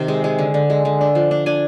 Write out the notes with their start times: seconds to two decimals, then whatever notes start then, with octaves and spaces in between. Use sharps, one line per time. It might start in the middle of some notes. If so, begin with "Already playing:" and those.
Already playing: C3 D#3
0.08 G#3
0.24 G#3
0.39 D3
0.54 D3
0.70 G#3
0.85 D3
1.01 D4
1.15 F3
1.31 D4
1.46 D4 G#5